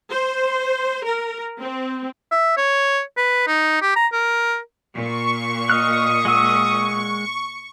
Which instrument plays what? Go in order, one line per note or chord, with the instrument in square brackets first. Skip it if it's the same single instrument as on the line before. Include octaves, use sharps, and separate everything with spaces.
[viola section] C5
A#4
C4
[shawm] E5
C#5
B4
D#4
G4
A#5
A#4
[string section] A#2 [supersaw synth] C#6
[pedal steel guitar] D#5 F6 F#6 [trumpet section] D#6
[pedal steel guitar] G#3 F#5 E6